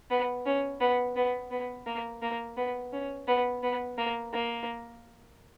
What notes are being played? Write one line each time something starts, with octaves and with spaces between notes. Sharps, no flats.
B3
C#4
B3
B3
B3
A#3
A#3
B3
C#4
B3
B3
A#3
A#3